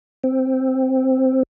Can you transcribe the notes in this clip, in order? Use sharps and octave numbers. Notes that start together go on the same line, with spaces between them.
C4